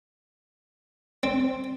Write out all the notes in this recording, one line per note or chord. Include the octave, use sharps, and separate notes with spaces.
C4